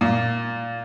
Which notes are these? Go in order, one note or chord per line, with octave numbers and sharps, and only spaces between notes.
A#2